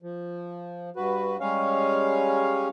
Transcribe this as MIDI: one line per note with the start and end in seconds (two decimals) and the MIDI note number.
0.02 0.90 53
0.96 1.37 43
0.96 1.37 66
0.96 1.37 71
1.40 2.68 55
1.40 2.68 56
1.40 2.68 61
1.40 2.68 73
1.40 2.68 77